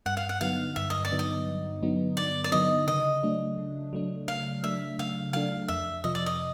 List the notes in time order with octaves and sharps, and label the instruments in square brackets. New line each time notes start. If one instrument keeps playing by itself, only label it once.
[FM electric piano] G2 [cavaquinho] F#5
[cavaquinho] F5
F#5
[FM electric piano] D3 F#3 B3 D#4 [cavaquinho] F5
[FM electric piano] G2 [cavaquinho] E5
[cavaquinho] D#5
D5
[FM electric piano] D3 F#3 B3 D#4
[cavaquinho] D#5
[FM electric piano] G2
D3 F#3 B3 D#4
[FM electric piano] G2 [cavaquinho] D5
[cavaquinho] D5
[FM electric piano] D3 F#3 B3 D#4 [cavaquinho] D#5
[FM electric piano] C#3 [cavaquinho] D#5
[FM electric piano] F#3 A3 D4
C#3
F#3 A3 D4
[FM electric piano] C#3 [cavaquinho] F5
[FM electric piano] F#3 A3 D4 [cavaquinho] E5
[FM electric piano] C#3 [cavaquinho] F5
[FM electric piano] F#3 A3 D4 [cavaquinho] F5
[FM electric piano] F2 [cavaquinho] E5
[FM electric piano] C3 F3 [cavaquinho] D#5
[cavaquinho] D5
D#5